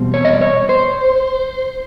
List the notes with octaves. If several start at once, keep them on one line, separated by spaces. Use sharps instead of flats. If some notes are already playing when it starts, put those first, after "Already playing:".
Already playing: E2 B2 G3 C4
C#5
D#5
D5
C#5
C5